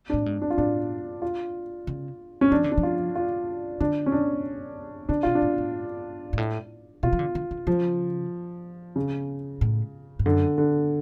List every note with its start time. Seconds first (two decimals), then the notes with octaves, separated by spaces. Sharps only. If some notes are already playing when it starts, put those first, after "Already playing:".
0.10 D4
0.13 A2
0.26 G#2
0.42 D4
0.50 F4
0.58 A2 D4
1.22 F4
1.87 C#3
2.41 C#4
2.51 F3 D4
2.64 D3
2.72 D4
2.78 F3
2.83 F4
3.15 F4
3.80 D3 D4
4.06 C#4
4.12 D4
5.09 C#3 D4
5.23 B2 F4
5.35 D4
5.42 A2
5.58 A2
6.33 G#2
6.38 A2
7.03 B2 F4
7.13 F3
7.19 D3
7.35 D3
7.51 C#3
7.67 C#3 F3
8.96 C#3
9.61 A2
10.19 G#2
10.25 F#2 D3
10.58 D3